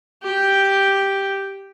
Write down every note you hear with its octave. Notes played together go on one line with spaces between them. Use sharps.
G4 G5